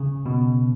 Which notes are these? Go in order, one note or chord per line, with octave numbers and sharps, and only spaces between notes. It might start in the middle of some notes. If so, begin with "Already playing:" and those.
Already playing: C#3
B2